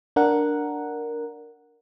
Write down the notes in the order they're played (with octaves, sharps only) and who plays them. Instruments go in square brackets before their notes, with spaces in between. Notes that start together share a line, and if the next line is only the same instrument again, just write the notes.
[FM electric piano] D4 A#4 F#5